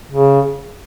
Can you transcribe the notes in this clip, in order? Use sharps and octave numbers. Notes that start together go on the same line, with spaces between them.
C#3